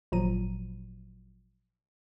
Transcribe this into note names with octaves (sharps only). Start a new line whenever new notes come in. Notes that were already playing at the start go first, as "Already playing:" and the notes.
G#1 A#2 F3 F#3 A#5 D#7